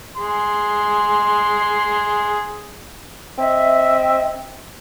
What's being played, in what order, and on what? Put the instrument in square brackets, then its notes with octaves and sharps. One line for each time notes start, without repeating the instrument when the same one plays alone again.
[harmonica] G#4 C6
[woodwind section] C4 D#5 E5